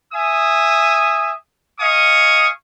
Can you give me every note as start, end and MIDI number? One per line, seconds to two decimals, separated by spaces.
0.14 1.33 76
0.14 1.33 80
0.14 1.33 87
1.80 2.47 75
1.80 2.47 77
1.80 2.47 80
1.80 2.47 85
1.80 2.47 87